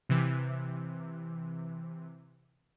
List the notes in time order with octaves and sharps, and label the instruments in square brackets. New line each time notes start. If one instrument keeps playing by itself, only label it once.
[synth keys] C3 E3